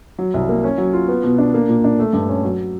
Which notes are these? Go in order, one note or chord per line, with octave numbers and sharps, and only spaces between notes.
F#3
C2
A#3
C#4
F#3
F4
B3
B2
D4
A#3
A#2
D4
A3
G2
C#4
F#3